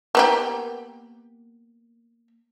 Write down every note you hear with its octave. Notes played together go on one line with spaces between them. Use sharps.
A#3 B3 G4